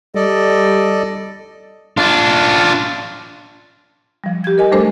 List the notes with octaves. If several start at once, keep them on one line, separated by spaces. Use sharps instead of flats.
G3 A4 D5 D#5
D4 F4
F3 G3
G4 G#6
A#4 D#5 G#5
G3 A3 D4 A4 A#4 C5